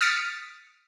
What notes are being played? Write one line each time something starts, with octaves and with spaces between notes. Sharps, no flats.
D#6 F6 A6 B6 C#7 D7